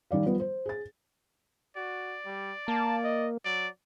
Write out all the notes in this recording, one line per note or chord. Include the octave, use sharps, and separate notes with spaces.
D#3 G3 D5 F5
F3 G3 B3
C5
G#4 A6
F#4 D5
G3
A#3 A5
D#5
F#3 D5